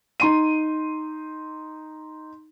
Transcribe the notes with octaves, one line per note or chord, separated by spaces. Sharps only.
D#4 C6 D#7